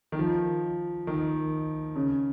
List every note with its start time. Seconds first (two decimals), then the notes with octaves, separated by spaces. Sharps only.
0.12 D#3
0.19 F3
1.07 D#3
1.96 C#3